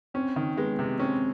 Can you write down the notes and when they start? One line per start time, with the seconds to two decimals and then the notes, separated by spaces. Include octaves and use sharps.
0.14 C4 C#4
0.36 D#3
0.57 G#3 B3
0.79 C3
0.99 C4 C#4